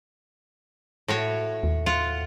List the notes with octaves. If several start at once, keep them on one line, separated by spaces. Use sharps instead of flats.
A2 F#4 C#5
D#2
F4 F#5